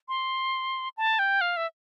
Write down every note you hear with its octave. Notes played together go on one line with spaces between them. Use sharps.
C6
A5
G5
F5
E5